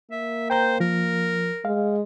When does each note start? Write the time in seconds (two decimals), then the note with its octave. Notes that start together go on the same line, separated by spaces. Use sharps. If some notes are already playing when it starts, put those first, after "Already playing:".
0.11 A#3 E5
0.50 C5 G5 A#5 G6
0.80 F3 A#4
1.65 G#3 F5